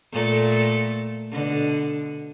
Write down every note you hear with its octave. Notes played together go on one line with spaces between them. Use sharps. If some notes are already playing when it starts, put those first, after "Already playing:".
A#2 A3 A4
B2 D3